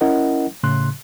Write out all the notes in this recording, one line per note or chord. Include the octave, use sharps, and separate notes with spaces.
C#4 E4 A#4 D#5 F#5
A2 C#3 C6 F#6